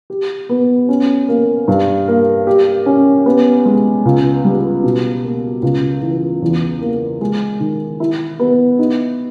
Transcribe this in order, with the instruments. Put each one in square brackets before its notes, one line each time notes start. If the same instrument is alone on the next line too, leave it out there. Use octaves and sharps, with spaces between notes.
[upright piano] G4
B3
C#4
A#3
G2
A#3
G4
C#4
B3
G#3
C#2
G3
B2
A#3
C#2
E3
E2
A#3
G#3
D#3
E4
B3
D#4